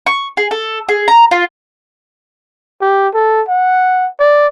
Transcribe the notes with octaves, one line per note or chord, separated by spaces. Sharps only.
C#6
G#4
A4
G#4
A#5
F4
G4
A4
F#5
D5